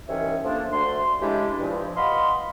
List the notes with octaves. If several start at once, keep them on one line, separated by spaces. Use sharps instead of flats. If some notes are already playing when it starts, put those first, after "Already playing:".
C2 D#3 E3 C#4 C#5 E5
F3 A3 A#3 D4
D2 D3 A3 C6
C#3 E3 G#3 D4 E4 G4
G2 A#2 F3
D#5 F5 F#5 B5 C6